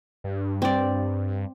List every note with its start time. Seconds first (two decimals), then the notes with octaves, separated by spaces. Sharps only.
0.24 G2
0.62 C4 D5